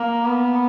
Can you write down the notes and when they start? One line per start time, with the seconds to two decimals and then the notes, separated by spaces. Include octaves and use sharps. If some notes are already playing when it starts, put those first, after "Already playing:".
Already playing: A#3
0.25 B3